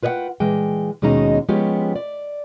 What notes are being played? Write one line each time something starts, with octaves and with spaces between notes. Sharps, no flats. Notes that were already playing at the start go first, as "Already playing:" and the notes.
F4 B4 C#5 D#5 F#5 G5
A#2 E3 G#3 G5
D#2 B2 G#3 C#4 D#4 A#5
F3 G#3 B3 C#4 F4 G4
D5